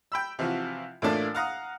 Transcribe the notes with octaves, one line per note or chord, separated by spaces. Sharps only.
G5 B5 E6
C3 E3 F3 F4 F#4
A2 E3 A3 A#3 D4 F4
F5 F#5 A#5 D#6